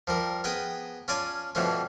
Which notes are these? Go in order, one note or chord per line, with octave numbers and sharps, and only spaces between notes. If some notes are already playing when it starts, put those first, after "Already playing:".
F3 G3 A#4
B3 G#4 D#5 G5
C#4 F4 D5 G#5 A5
G2 B2 E3 F3 A3 C#4